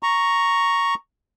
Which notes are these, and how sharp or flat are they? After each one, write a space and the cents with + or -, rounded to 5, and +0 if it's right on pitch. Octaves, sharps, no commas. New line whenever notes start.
A#5 +0 C#6 +0